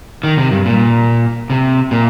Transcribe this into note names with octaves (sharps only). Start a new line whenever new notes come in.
D#3
C3
G2
A#2
C3
A#2